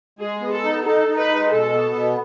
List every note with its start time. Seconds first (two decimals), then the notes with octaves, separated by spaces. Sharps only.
0.19 G#3 G#4
0.41 B3
0.52 A4
0.62 D#4
0.84 D#4 A4
1.07 D#4
1.17 B4
1.29 G#3
1.51 B2 A4
1.73 B3
1.95 B2